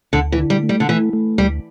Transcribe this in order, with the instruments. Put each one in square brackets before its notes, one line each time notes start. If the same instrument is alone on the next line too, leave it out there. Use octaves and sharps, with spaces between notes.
[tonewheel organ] D2 [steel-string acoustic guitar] D3
[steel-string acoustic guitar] E3
[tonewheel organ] D3
[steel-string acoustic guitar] G3
[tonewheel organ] A3
[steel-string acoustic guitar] G3
D3
[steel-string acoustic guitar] E3 [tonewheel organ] A3
[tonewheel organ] A3
[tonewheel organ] D2 [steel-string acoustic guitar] G3